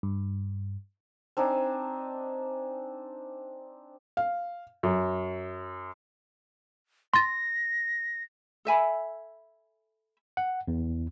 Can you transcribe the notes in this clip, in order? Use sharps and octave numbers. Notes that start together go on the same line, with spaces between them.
G2
C4 D4 D#4 G#5
F5
F#2
C6 A6 A#6
A4 E5 G#5 B5
F#5
E2